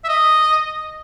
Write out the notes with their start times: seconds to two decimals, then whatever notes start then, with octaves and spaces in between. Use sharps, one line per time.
0.04 E5
0.09 D#5